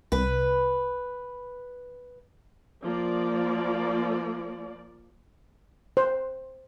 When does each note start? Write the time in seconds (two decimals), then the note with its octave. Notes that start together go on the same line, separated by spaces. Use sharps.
0.12 C2 B4
2.83 F3 A#3 D5
5.97 C5